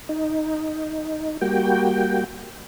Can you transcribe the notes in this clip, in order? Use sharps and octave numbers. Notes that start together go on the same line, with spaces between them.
D#4
G3 A#3 F#4 G5